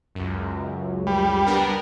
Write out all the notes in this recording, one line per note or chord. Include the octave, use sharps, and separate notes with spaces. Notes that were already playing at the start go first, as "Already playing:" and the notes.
C#2 F#2
G3
B3 D4 A#4